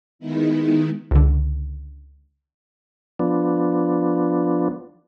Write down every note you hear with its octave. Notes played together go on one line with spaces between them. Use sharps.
D#3 G#3 B3 D#4 E4
C#2 D3
F3 B3 D4